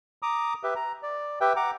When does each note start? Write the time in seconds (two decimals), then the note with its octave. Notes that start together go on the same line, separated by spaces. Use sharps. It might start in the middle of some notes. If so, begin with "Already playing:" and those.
0.23 A#5 D6 D#6
0.63 G4 B4 E5
0.76 A#5
1.03 D5
1.41 G4 B4 E5 G5
1.56 F#5 A#5 D6